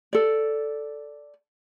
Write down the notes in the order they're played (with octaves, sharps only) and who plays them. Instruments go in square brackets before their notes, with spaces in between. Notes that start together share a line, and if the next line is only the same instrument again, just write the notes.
[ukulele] A4 D5